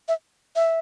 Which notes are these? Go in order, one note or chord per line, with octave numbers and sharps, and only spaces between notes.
E5
E5